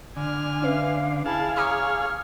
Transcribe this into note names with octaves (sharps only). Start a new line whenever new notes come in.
D3 G#5 F6
C#4 B4 E5 F5
E4 G#4 F5 A5 B5
C#5 A#5 D6 D#6 F6